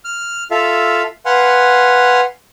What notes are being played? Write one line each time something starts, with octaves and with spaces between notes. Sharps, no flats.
F6
F4 A4 E5 F5
B4 F5 F#5 G#5 C6